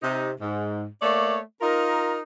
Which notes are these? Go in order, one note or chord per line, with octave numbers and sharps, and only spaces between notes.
C3 D#4
G#2
A3 A#3 C#5 D5
D#4 F4 A#4